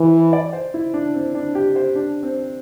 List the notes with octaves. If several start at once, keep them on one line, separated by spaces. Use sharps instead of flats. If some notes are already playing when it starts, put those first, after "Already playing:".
Already playing: E3 C5
D5
C5
E4
D4
C4
D4
G4
C5
D4
C4